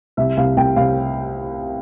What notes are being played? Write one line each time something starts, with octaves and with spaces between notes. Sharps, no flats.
C2 E5
C2 F5
C2 G5
C2 F5